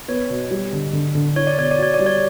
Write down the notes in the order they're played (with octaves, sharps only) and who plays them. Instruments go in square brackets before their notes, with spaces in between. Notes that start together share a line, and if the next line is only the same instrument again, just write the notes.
[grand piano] B3 [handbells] C#5
[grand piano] B2
G3
D3
D3
D3
[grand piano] E4 [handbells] C#5
[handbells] D5
[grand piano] B2 [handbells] C#5
[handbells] D5
[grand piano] F#4 [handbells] C#5
[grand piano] G3 [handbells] D5
[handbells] C#5